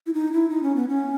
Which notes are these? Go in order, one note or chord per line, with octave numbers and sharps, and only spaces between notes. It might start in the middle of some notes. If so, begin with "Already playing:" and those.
E4
D#4
E4
D#4
C#4
B3
C#4